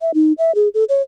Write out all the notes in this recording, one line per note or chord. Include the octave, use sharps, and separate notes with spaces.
E5
D#4
E5
G#4
A4
C#5